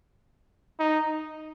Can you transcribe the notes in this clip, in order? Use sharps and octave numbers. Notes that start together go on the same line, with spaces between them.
D#4